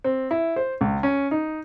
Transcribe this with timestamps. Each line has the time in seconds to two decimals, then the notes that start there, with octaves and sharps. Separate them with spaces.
0.04 C4
0.31 E4
0.56 C5
0.81 C#2
1.03 C#4
1.31 D#4